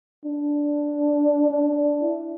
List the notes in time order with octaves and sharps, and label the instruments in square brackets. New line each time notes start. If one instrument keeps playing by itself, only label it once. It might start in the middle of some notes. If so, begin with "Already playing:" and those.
[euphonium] D4
D4
E4